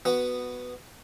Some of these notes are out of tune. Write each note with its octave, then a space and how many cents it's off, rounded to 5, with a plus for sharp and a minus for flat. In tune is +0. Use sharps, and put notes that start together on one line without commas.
B3 +0 F#4 +0